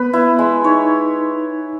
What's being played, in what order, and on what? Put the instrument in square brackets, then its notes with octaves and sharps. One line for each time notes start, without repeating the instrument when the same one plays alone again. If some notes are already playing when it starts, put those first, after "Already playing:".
Already playing: [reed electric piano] B3 [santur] B4
[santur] E4
G#3
[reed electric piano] D#4 [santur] C#5